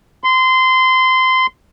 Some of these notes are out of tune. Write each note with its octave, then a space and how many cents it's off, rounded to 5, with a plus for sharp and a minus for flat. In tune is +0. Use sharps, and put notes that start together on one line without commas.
C6 -20